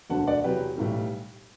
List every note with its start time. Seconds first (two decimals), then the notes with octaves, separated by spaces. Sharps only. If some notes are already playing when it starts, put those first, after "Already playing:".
0.10 E1 D2 D3 F#3 F#5 A5
0.27 D5 F#5
0.44 E2 C3 F#3 G4 B4
0.77 B1 A2 E3 G3